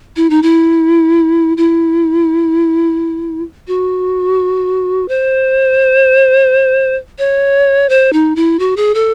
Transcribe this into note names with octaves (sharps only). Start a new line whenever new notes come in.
E4
D#4
E4
E4
F#4
C5
C#5
C5
D#4
E4
F#4
G#4
A4